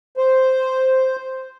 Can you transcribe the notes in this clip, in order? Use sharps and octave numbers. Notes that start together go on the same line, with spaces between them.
C5